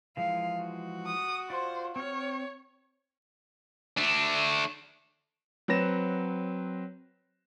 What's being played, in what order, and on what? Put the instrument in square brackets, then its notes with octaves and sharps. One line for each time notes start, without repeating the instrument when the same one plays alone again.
[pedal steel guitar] E3 F3 G#3 [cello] F5
[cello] F#4
[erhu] D#6
[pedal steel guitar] F4 D5 [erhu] C5
[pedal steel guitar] C4 F6 [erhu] C#5
[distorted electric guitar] A3 D4
[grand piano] F#3 C4 B4 A#6 E7